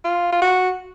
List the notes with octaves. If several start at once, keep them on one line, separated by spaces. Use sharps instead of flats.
F4
F4
F#4